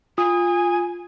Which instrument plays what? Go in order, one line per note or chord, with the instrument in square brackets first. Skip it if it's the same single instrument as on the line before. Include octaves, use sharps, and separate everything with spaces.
[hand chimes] F4 D#6 [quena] G#5